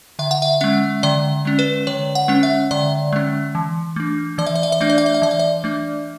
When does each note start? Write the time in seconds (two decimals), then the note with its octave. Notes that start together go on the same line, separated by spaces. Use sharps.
0.19 D3 E5
0.31 F#5
0.42 E5
0.61 G#3 C#4 E5
1.03 D3 D5
1.45 G#3 C#4
1.59 B4
1.87 D3 C#5
2.15 F#5
2.28 G#3 C#4
2.43 E5
2.71 D3 D5
3.13 G#3 C#4
3.55 E3
3.96 A3 D4
4.38 E3 D5
4.46 E5
4.55 D5
4.63 E5
4.72 D5
4.81 A3 D4 E5
4.90 D5
4.98 E5
5.06 D5
5.14 E5
5.22 E3 D5
5.31 E5
5.39 D5
5.64 A3 D4